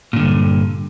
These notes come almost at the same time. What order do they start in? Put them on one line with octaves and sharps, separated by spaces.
A#2 D3 G2